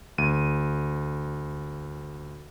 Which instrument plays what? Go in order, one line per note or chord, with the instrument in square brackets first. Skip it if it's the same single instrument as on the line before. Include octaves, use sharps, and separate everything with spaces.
[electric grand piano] D2 D#7